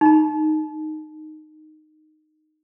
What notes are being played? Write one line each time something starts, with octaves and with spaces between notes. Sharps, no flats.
D#4 A#5